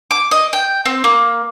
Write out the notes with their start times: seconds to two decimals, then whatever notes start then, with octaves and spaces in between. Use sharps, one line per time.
0.11 D6
0.31 D#5
0.53 G5
0.86 C4
1.04 A#3